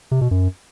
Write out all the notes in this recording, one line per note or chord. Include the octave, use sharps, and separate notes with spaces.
C3
B2
F#2